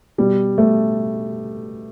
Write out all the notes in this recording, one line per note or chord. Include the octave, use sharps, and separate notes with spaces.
B2 G3
A3